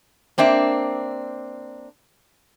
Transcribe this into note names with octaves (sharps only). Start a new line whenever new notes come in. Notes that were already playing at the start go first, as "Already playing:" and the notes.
A#3 C4 D4 E5